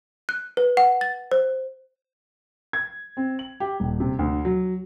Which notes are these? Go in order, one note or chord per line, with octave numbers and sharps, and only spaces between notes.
F#6
B4
F#5
A6
C5
G#6
C4
F#7
G4
D#1
C3
D2
F#3